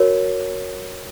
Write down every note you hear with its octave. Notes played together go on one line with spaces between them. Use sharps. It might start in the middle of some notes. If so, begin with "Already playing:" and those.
Already playing: F#4 A#4 C#5